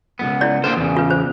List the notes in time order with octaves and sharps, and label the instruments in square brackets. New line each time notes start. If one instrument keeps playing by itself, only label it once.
[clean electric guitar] C#2 G2 B3
[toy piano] E4 D5
[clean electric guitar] A#3 D4 C5 [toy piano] B4
[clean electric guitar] E2 C#3
[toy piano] F4 B4
C5